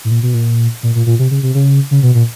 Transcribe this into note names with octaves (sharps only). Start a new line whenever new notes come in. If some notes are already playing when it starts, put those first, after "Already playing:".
A2
A#2
B2
A#2
A#2
A#2
A#2
C3
C#3
C3
C#3
C#3
B2
A#2